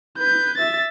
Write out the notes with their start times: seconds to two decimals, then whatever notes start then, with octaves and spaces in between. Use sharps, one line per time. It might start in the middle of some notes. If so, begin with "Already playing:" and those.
0.18 B4 G6
0.58 E5 A6